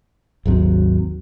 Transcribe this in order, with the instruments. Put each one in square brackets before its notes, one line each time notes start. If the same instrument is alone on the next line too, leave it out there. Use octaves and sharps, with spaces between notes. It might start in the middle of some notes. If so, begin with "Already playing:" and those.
[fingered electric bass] G#1 D#2 F#3 C4